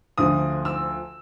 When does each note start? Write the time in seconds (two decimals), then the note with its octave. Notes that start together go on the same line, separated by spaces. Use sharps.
0.18 D2 D3 F3 D#6
0.65 E6